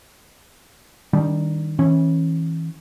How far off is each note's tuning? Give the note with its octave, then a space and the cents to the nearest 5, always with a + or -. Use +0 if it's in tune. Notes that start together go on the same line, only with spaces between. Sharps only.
D#3 +0 G3 +0 D4 -30
E3 -30 C#4 -25